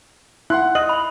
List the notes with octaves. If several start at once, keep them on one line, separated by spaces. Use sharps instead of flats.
E4 F#5 C6 F#6
D#5 F#7
B5